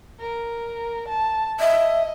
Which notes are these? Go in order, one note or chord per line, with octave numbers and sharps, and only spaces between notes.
A#4
A5
D#5 E5